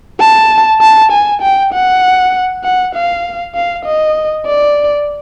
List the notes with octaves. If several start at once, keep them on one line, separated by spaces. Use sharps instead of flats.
A5
A5
G#5
G5
F#5
F#5
F5
F5
D#5
D5